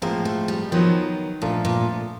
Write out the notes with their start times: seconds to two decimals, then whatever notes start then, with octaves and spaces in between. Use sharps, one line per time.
0.02 A2 F3 G#3 A#3 C4
0.25 A3
0.48 G3
0.71 D#3 F3 F#3 B3 D#4
1.42 A#2 F3 A3 D4 F4
1.65 A#2